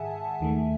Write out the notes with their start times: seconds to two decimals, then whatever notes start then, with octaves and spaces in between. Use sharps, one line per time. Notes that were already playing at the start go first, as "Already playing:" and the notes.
Already playing: G#2 D#3 G#4 E5 F#5 G#5 A5
0.40 D#2 D#3 A3